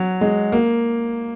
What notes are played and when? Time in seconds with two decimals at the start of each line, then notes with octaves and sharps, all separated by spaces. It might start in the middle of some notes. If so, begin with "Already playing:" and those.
Already playing: F#3
0.21 G#3
0.52 A#3